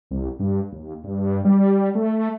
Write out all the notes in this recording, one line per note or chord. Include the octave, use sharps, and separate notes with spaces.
C2
G2
D#2
G2
G3
A3